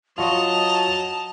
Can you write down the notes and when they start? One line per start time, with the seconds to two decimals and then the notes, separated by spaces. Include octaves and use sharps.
0.18 F#3 F4 F#4 D#5 A5 F7